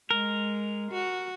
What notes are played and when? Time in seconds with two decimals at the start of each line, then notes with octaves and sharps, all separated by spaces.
0.11 G#3 A#4
0.92 F#4